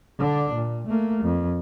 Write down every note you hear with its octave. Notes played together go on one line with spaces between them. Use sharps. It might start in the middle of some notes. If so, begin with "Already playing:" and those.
D3 D4
A#2
A3 A#3
F2